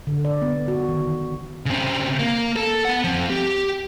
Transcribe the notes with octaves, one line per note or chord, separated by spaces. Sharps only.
D3
D5
B3
F#4
D#3
D#3
C#3 C4
A#3
A4
B3 F#5
F3 C4
G4